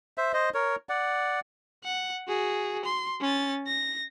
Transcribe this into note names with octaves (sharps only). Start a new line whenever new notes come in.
C5 E5
C5 D#5
A#4 C#5
D5 F#5
F#5
F#4 G#4
C6
C#4 A6
A#6